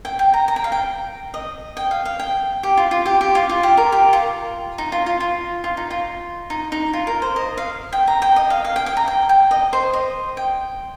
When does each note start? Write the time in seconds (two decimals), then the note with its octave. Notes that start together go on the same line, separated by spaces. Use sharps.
0.05 G5
0.19 G5
0.34 A#5
0.48 A#5
0.56 G5
0.64 F5
0.72 G5
1.34 D#5
1.77 G5
1.91 F5
2.05 F5
2.20 G5
2.63 G4
2.77 F4
2.91 F4
3.06 G4
3.21 G4
3.35 F4
3.49 F4
3.63 G4
3.77 A#4
3.92 G4
4.13 F4
4.78 D#4
4.92 F4
5.06 F4
5.20 F4
5.64 F4
5.77 D#4
5.91 F4
6.50 D#4
6.72 D#4
6.93 F4
7.07 A#4
7.22 C5
7.36 D#5
7.57 F5
7.93 G5
8.07 A#5
8.22 G5
8.36 D#5
8.50 F5
8.65 F5
8.76 G5
8.86 G5
8.97 A#5
9.08 G5
9.29 G5
9.51 D#5
9.73 C5
9.93 D#5
10.37 G5